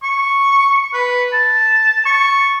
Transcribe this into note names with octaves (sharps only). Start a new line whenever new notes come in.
C#6
B4
A5
C#6